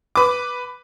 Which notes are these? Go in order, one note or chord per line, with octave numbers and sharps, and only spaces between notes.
B4 D6